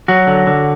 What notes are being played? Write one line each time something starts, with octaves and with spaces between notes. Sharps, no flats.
F#3 F#4
D3
D3